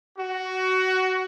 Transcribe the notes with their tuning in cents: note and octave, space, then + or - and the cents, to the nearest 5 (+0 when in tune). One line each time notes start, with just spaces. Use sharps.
F#4 +15